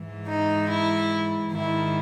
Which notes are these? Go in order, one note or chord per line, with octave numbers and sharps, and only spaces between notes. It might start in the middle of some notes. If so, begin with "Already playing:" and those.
Already playing: G#2 E3
D#4
E4
G#2 D#3 E4